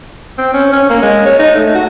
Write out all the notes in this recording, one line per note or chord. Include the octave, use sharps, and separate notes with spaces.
C4
C#4
C#4
A#3
G#3
C#5
D#4
A3
F#4